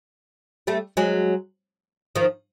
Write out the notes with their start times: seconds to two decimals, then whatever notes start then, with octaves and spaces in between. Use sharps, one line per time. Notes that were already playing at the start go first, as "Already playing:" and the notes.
0.67 G3 A3
0.97 F#3 G#3
2.15 D#3 F3